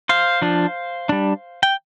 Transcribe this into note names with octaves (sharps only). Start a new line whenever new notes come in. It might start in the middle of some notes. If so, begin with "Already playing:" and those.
C5 F5
F3 D4
G3 D4
G5